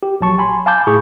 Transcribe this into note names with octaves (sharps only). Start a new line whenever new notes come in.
G4
A#1 F#3 A5 C#6
G#5 B5 C6
F5 G#5 A5 B5 D6 G6
A2 G#4 B5 C#6